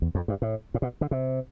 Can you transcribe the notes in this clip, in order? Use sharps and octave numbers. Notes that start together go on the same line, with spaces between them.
E2
F2
G2
A2
A2
B2
D3
C3